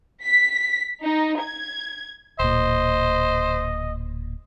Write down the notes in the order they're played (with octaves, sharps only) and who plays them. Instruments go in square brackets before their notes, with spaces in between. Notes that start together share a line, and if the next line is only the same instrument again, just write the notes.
[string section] B6
D#4
G#6
[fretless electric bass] D1 A#2 [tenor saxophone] C5 [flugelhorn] D#5